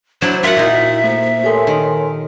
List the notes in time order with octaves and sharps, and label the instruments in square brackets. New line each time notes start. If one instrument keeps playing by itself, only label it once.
[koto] F#3 D4 E4 [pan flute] C5
[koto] F4 F#5 [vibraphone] F#4 A#4 [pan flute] E5
[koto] A#2 D#4 [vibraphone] E4 [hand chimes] F#4
[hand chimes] A3 [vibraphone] A#3 C5
[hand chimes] G4 A4 A#4 [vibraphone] C#5 G#5 C6
[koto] D#3